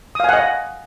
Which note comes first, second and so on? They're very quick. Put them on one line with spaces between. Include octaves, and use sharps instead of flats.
D#6 F5 G#5 F#5 D#5